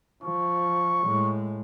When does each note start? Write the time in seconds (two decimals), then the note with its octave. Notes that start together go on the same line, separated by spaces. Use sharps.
0.24 F3 C#6
1.04 A2 G#3